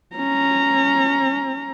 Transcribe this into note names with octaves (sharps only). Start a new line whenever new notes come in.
C#4 A#5